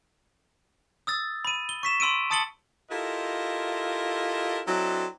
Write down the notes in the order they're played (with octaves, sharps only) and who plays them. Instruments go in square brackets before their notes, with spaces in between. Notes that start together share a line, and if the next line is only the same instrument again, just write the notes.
[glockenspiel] D#6 E6 A6
B5 D#7
G7
C#6 B6 E7
B5 C6 E6 D7 D#7
A5 D#6 A6 C#7 F#7 G7
[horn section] E4 F4 G4 A4 A#4 D#5
F#3 C4 D4 E4 A4 D#5